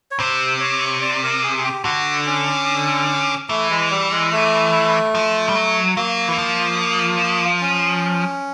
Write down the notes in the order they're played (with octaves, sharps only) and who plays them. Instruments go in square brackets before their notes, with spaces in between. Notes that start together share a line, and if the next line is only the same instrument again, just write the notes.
[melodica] C#5
[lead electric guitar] C3 [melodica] C5
[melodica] C#5
D5
A#4
G#4
G#4
G4
[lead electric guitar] D3 [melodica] F#4
[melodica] C#4
[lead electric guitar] E3 [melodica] A3
[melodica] G#3
G3
G#3
A3
[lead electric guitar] F3
G3
F#3
[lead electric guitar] F#3 [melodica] A#3
[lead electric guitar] E3
F3
[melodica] C#4